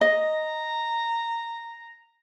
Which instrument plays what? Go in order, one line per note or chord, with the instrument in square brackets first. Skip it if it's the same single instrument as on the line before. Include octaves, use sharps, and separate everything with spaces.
[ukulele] D#5 [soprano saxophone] A#5